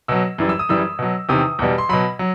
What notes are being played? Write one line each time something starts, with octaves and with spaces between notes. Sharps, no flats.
B2 F#3 E6
F#2 E3 G3
E6
D#6
F#2 E3 G3 E6
B2 F#3
E2 C3 D#3 D#6
E2 B2 G3
C6
B2 F#3 B5
F#3